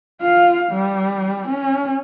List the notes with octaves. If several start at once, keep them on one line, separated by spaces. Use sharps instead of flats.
F4 F5
G3
C#4